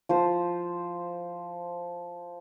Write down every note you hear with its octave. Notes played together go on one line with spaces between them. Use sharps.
F3 C5